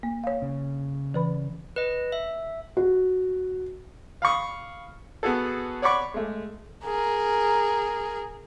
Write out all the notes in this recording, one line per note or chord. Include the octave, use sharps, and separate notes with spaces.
A#3
C#5 F5
C#3
E3 B4 B5
B4 D#5
E5
F#4
F5 B5 C#6 D#6
B3 F#4 G#4 A4
C#5 D5 F#5 B5 C#6 D6
G#3 A3
G#4 A#4